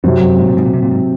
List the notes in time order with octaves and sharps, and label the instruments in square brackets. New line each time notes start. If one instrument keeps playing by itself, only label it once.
[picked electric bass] F#2 [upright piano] C3 F#3 C4
[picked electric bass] F#2
G#2
A#2
G#2
A#2
C3
A#2
G#2